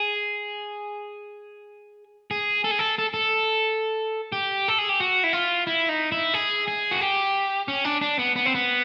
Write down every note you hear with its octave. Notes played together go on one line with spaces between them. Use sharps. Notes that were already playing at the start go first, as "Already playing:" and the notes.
Already playing: G#4
G#4
A4
G#4
A4
A4
A4
G4
A4
G#4
G4
F#4
E4
F4
E4
D#4
E4
G#4
G#4
F#4
G4
C#4
D4
D4
B3
B3
C4
B3